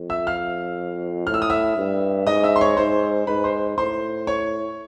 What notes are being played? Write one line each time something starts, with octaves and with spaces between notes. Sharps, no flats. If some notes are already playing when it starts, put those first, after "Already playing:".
Already playing: F2
E5 E6
F5 F6
A2 F6
E6
D#6
E5 E6
G2
G#2 D#5 D#6
E5 E6
C6
C#5 C#6
G#2 C5 C6
G#2 B4 B5
C5 C6
A2 C5 C6
C#5 C#6